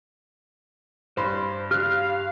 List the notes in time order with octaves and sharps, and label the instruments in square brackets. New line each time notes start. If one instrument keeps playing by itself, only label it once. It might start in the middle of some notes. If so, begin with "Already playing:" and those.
[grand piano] G2 B5 C6 [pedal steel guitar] C5
[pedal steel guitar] G4 F#6 [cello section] F5 [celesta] F6